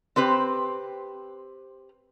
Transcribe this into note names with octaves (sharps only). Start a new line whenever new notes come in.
C4 G4 B4 C5